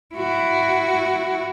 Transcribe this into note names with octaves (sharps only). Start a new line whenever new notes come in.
E4 F#4